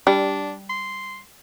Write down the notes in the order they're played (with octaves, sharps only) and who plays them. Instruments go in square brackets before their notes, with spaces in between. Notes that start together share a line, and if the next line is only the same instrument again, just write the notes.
[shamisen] G3 [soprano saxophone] D4
[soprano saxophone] C6